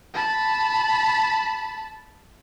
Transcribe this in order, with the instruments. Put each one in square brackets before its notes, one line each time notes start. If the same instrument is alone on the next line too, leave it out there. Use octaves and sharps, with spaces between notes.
[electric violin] A5 B5